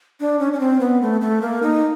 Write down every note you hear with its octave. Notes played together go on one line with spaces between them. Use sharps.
D4
C#4
C#4
C4
B3
A3
A3
A#3
D#4